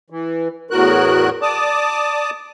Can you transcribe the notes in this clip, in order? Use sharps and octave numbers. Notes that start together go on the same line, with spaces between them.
E3
E2 A2 F#4 A#4 F#6
D5 A5 D6 D#6